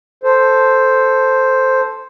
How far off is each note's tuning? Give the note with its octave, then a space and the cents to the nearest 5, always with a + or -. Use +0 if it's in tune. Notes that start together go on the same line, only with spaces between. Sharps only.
A4 +0 C5 +0